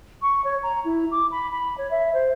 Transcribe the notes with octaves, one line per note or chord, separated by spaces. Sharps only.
C#6
C#5
A#5
E4
D6
B5
B5
C#5
E5
C5